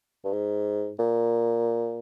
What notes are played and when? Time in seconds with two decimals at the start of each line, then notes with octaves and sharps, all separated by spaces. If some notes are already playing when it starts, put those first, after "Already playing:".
0.25 G2
0.33 G#2
0.99 A#2